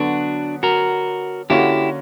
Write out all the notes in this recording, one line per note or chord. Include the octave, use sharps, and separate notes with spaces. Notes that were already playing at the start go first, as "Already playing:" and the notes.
Already playing: D3 F#3 B3 D4 F#4
F#4 A#4
D3 A#3 C#4 E4 F#4 G4